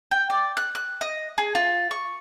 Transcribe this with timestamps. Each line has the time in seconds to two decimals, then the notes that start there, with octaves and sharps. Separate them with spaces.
0.11 G5
0.30 D5
0.57 F#6
0.75 F#6
1.01 D#5
1.38 G#4
1.55 F4
1.91 C#6